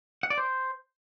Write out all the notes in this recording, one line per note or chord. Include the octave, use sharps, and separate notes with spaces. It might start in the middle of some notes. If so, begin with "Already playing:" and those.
F#5
D5
C5